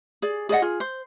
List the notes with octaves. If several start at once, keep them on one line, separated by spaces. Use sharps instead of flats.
G#4 D5
G#4 D5 D#5 F#5
F4 G#4
C5